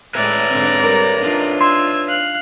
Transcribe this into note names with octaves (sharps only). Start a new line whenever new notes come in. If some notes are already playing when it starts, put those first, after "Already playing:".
A2 G#3 B4 C#5 D5 E5 A#5
G#2 D3 C4
G3 A#4
D4 D#4 F4
C6 E6 G#6
F5 F#6